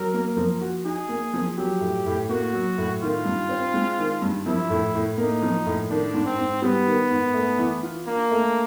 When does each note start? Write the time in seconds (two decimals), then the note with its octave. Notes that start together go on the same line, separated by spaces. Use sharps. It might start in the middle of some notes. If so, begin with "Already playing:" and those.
Already playing: F#3 A#4
0.14 A#3
0.37 F3
0.61 F#4
0.85 D#4 G#4
1.09 A#3
1.33 F3
1.57 F#3 G4
1.81 A2
2.06 A2
2.29 A#3 F#4
2.53 F#3
2.78 A2
3.02 D#3 F4
3.25 G2
3.49 C4
3.74 G#3
3.98 D#3
4.22 G2
4.46 F3 E4
4.70 A2
4.94 A2
5.18 A#3 D#4
5.42 F3
5.66 A2
5.89 D#3 D4
6.14 G#2
6.26 C4
6.38 G#2
6.62 G3 B3
6.86 D#3
7.11 G#2
7.34 A3
7.58 E3
7.83 F4
8.06 A#3 D4
8.31 A3